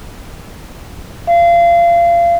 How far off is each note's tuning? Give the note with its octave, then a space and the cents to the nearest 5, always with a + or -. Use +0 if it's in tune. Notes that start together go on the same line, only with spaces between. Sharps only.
F5 -30